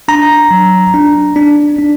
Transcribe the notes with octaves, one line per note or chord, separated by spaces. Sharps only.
D4 A#5
F#3
D4
D4
D4